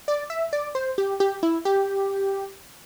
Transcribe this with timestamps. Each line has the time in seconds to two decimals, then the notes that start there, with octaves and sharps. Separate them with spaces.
0.08 D5
0.30 E5
0.53 D5
0.75 C5
0.98 G4
1.20 G4
1.43 E4
1.65 G4